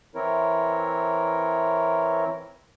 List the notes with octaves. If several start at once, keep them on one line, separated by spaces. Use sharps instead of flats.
E3 C4 E4 A#4 C#5